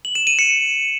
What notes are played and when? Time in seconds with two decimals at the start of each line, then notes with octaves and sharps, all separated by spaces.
0.05 F#7
0.15 E7
0.27 D#7
0.39 C#7